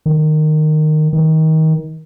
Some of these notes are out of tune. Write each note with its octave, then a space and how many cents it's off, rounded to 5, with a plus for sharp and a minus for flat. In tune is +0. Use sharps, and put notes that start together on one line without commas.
D#3 -15
D#3 +25